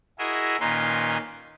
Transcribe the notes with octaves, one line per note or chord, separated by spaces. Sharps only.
E4 F#4 G#4 A#4 D#5 E5
A#2 D#3 C#4 A#4 B4 C6